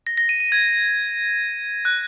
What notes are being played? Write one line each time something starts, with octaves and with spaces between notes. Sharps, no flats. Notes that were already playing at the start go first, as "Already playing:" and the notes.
A#6
A#6
D#7
D#7
G#6
F#6